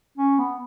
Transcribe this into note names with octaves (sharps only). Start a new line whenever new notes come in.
C#4
B3